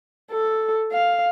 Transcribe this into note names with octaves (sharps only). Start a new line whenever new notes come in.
A4
F5